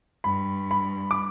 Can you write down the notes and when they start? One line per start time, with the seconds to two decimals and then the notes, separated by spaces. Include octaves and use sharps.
0.24 G2 B5
0.71 B5
1.11 D6